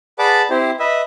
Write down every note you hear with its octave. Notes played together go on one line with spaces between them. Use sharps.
G#4 B4 D5 F#5 A5 D6
C4 E4 G4 C5
B4 D#5 E5